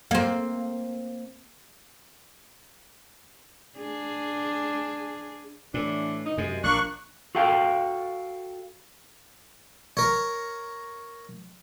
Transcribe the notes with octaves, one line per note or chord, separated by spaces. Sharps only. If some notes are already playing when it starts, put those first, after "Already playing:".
A#3 C4
D4 G#4
A2 E3 D4
B2 E3 D#4
F#2 C3 G#3
A#1 A#3 D4 C#6 F#6
F#4 A4 F5 G5
A#4 C#5